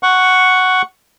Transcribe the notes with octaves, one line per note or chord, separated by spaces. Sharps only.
F#5 C#6